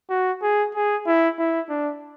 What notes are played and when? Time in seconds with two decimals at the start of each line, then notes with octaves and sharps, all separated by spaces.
0.10 F#4
0.42 G#4
0.75 G#4
1.06 E4
1.39 E4
1.70 D4